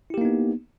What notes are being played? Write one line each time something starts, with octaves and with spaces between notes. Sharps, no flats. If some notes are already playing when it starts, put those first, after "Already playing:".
A#3 B3 D#4 E4 G4